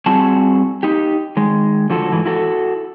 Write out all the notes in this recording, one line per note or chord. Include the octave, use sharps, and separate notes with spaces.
G3 C4 E4 F#4 G#4 A5
D#4 G4
D#3 G#3
D3 F3 F#4 A4
G#2 E3
E4 F#4 A4